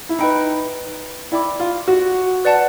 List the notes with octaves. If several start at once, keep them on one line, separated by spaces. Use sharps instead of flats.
E4
D#4 B4 D#5 G5 B5
E4 D5 G5 B5 D6
F4
F#4
B4 D5 F#5 A5